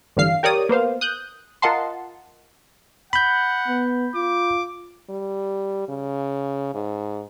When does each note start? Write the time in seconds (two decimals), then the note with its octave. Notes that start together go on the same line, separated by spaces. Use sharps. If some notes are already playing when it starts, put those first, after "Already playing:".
0.17 A1 G2 D3 E3 F5 C7
0.43 G4 A#4 C#5 D5 D#6
0.69 A#3 B3 C5 F5
1.01 D#6 F#6 G6
1.62 F4 A#4 D#5 F#5 A5 C6
3.13 F#5 B5 G6
3.68 B3
4.15 F4 D6
5.09 G3
5.88 C#3
6.74 G#2